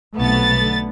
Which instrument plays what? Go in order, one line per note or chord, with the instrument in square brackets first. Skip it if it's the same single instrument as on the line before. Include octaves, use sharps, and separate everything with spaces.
[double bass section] B1 C3 A3 [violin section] B3 A6
[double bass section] D3 A3